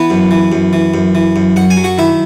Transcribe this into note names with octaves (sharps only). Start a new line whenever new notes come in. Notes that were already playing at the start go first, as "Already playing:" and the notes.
Already playing: E3 B3 B4
F#2
E3
F#2
E3
F#2
E3
F#2
F#2 F#5
G#5
F#3
F#4 F#5
D#3 E4 E5